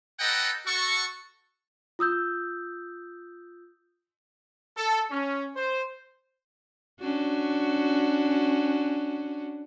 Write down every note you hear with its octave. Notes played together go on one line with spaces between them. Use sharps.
A4 B4 D#5 F#5 G5 A#5
F#4 A4 C#6
F4 D#6 E6 G6
A4
C#4
C5
C#4 D4 F#4